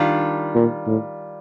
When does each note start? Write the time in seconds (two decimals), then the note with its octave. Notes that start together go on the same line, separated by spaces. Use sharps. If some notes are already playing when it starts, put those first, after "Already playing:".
Already playing: D#3 G3 D4 F4
0.55 A#2
0.87 A2